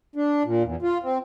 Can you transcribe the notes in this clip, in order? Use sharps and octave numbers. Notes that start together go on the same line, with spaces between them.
D4
A#2
E2
F4
C4